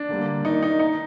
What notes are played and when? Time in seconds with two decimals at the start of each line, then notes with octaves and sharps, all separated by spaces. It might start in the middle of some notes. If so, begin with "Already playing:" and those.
Already playing: D4
0.09 D3 G3 A#3
0.44 D#3 A#3 D#4
0.63 D#4
0.79 D#4